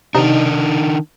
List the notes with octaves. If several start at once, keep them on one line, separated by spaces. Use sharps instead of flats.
C3 D#3 D4 D#4